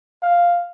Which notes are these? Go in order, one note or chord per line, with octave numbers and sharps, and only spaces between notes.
F5